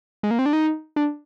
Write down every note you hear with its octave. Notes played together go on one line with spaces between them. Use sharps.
G#3
A#3
C4
D4
D#4
D4